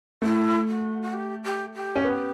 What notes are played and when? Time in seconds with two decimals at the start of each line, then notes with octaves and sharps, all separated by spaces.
0.22 A3 E4
0.68 F#4
1.02 F#4
1.13 G4
1.44 G4
1.74 G4
1.95 C#4
2.04 B3